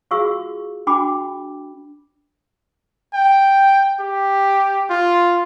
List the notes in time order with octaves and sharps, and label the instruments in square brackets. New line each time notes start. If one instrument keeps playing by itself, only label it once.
[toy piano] F4 F#4 G#4 F5 C#6 E6
D4 F#4 G5 B5 D6
[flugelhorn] G5
G4
F4